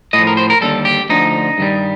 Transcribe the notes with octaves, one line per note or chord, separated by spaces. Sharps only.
A2 F3 D#5
A#4
C5
A#4
D#2 D3 G3 A4
G4
D2 D3 F3 D#4
G2 D#3 G3